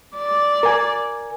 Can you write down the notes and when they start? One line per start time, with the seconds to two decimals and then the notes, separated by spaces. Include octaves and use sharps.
0.16 D5
0.63 A#4 G#5